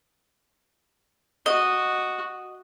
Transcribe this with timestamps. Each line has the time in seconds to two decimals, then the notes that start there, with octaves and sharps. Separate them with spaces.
1.46 F#4 D#5